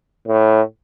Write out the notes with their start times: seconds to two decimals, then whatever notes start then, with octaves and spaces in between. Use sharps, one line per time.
0.27 A2